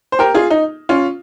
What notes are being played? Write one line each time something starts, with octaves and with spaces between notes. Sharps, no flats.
C5
G4 A#4
F4 G#4
D#4
C#4 F4